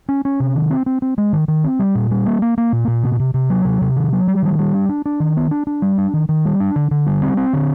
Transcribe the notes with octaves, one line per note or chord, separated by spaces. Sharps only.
C#4
C#4
C3
D#3
C4
C4
C4
G#3
D#3
D#3
C4
G3
A#2
G3
A#3
A#3
A#3
A#2
A#2
C3
C3
C3
F#3
C3
C3
D#3
F#3
G3
D#3
G3
D4
D4
D4
D#3
B3
D4
D4
G3
D4
D#3
D#3
G3
D4
D3
D3
G3
C4
C4
D3